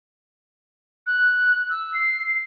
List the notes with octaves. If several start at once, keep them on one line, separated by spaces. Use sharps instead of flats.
F#6
E6
C7